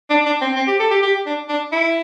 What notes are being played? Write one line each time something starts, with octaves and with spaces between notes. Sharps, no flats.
D4
D4
C4
C4
G4
A4
G4
G4
D4
D4
E4